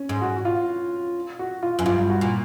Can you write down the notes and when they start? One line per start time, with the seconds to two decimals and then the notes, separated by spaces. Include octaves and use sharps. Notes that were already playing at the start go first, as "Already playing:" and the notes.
Already playing: C#4
0.09 G#2
0.21 F#4
0.37 F#4
0.45 F4
1.39 F#4
1.63 F4
1.79 F#2
1.86 G2 F4
2.10 F#4
2.21 A#2